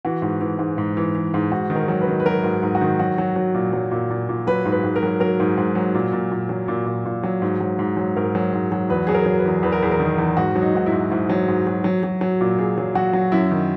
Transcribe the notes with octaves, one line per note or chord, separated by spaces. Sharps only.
E3 F#4
G#2
E3
G#2
G#2
E3
E3
G#2
G#2 F#4
D#3
A#4
F#3
B4
D#3
B4
F#3 A#4
G#2
G#2
F#4
D#3
F#3 F#4
F#3
F#3
A#2
F#3
A#2
A#2
A#2
F#3 B4
G#2
B4
G#2
A#4
F#3
F#3 A#4
G#2
G#2
F#3
A#2
A#2
A#2
F#3
A#2
A#2
A#2
F#3
G#2
F#3
G#2
F#3
G#2 A#4
F#3
G#2
F#3
E2 B4
F#3 G#4
A#4
F#3
B4
E2
E2 B4
A#4
E2 G#4
A#4
D#3
E2
G#2 F#4
F#3
D#4
G#2 F#4
E4
G#2
G#2 E4
F#3
G#2
F#3
F#3
F#3
F#3
A#2
A#2 G#4
F#3
F#3 F#4
F#3
F#2 E4
D#3